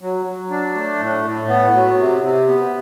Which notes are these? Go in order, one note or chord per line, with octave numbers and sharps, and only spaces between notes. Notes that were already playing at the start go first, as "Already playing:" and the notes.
F#3
F#3
D4
A3
A2
A2
B3
F#3
C3
C3
B3